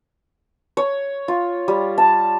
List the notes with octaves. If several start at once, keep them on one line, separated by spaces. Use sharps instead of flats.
C#5
F4
G3
A5